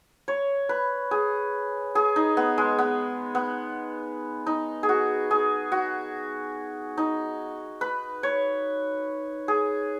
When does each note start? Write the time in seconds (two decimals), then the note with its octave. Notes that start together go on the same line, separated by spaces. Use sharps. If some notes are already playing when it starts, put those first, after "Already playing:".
0.28 C#5
0.69 B4
1.11 G#4
1.95 G#4
2.16 D#4
2.37 B3
2.58 G#3
2.78 B3
3.35 B3
4.46 D#4
4.83 G#4
4.89 F#4
5.31 G#4
5.72 F#4
6.97 D#4
7.81 B4
8.23 C#5
9.48 G#4